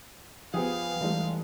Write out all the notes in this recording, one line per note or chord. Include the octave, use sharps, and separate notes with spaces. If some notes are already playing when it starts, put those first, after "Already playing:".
F3 B3 G4 G#4 F5
F1 E3 G3 G#3